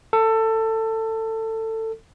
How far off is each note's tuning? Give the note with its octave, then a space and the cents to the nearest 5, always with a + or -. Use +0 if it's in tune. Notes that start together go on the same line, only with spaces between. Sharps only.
A4 +20